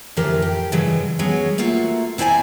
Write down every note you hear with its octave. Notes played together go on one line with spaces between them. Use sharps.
F2 A2 D3 E3 G4 A#4
G4
G2 C#3 E3 F#3 G#3
F#3 G#3 B3 C#4
A3 A#3 F4 F#4
C4 E4 C5 D5 G#5 A#5